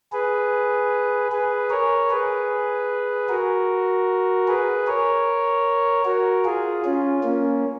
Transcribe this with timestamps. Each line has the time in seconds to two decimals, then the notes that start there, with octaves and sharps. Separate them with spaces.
0.12 G#4 B4
1.32 G#4 B4
1.70 A#4 C#5
2.10 G#4 B4
3.29 F#4 A#4
4.48 G#4 B4
4.87 A#4 C#5
6.05 F#4 A#4
6.45 F4 G#4
6.85 C#4 F4
7.24 A#3 C#4